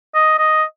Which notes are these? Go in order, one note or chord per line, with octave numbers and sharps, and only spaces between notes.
D#5
D#5